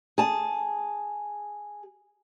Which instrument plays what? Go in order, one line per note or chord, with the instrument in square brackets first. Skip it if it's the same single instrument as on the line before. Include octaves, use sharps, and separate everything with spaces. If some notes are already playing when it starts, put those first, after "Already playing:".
[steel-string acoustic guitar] G#4 A5